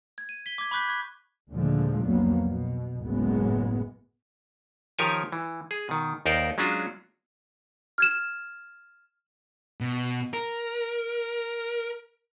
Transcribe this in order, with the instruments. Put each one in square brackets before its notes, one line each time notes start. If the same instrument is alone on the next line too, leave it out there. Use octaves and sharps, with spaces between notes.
[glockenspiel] G#6
D#7
B6 G7
D6 G#6
B5 C#6 D6 F#6 G6 B6
C#6 G#6
[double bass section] D#2 A#2 D3 F3 G#3 A3
C2 F2 F#3 A#3 B3
B2
F#1 C#2 F#2 A2 G#3 B3
[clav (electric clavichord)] D#3 F3 G4 A#4 C#5 G#5
E3
G#4
B2 D#3
D#2 D#4 A#4 C5 D5
F#3 G#3 C#4 D4 F4 F#4
[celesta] F6 G#6 E7
[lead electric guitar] B2
A#4